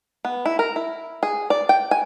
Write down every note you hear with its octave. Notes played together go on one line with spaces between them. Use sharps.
B3
E4
A#4
E4
G#4
D5
G5
G#5